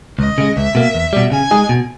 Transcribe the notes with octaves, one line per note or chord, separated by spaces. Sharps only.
C#2 D#5
C#3 G#3
C#2 E5
B2 A#3
E2
B2 G3
C#3 G#5
G#3 D#4 G#4
B2